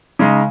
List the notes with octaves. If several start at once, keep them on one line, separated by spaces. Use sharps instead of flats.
C#3 G#3 D#4